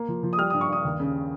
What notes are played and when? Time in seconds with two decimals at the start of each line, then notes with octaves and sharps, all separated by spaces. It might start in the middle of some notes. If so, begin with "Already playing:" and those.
Already playing: A#3
0.08 F3
0.23 F3
0.33 D#6
0.38 G3 F6
0.50 D#6
0.54 G2
0.61 C#6
0.69 G2 D#6
0.85 D#2
1.00 C#3